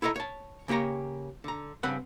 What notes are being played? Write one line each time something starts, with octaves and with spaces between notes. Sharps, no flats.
E4 A4 C#5 D#5 A#5
C#5 A5
C#3 A#3 G4 C#5 A#5
D3 A#5
G2 C#3 C4 B4 F#5